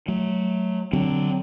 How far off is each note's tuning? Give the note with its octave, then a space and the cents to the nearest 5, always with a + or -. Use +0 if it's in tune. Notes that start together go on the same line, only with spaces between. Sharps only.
F#3 +0 A3 -15
D3 +0 F#3 +10 C4 +0